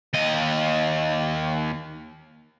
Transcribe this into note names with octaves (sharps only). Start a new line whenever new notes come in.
D#2 D#5